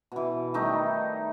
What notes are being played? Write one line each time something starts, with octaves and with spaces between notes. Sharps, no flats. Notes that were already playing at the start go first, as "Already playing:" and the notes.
B2 E3
D#3 G3 A3 D#4